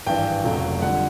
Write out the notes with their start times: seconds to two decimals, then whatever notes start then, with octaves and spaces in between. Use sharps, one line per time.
0.06 G#1 G2 E3 G5
0.44 F1 F2 C#3 F#3 A3
0.82 F2 D3 G3 F#5